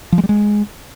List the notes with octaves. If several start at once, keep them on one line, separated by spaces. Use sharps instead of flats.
F3
G#3
G3
G#3